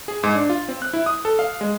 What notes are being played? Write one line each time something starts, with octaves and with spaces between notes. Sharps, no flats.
G#4
G#2
D4
F4
C4
F#6
E4
D#6
A4
F5
G#3